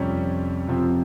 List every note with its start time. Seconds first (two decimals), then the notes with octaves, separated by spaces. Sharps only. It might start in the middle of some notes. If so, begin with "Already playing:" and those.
Already playing: F2 C3 G3 C#4 C#5
0.68 F2 C3 F3 C4